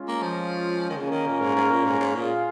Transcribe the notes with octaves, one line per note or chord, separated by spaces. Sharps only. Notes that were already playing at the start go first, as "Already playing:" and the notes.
Already playing: G#3 C#4 F4
A#3
F3
D#3
C#3 A#3 C#4 A#4
D#3
A#2
G#2
G#2
A#2
G#2
G#2
A#2 F4 G#4 F5